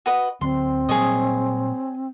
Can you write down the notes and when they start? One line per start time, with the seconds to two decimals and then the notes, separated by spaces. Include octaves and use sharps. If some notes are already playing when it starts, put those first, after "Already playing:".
0.06 F#4 B4 D#5
0.41 D2 D3 F#3 C4 C6
0.89 A#2 F#3 G3 G#4 C#5 D#5